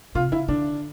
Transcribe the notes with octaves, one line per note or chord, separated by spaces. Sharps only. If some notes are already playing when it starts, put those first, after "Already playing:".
C3 F4
C#3 E4
D3 D4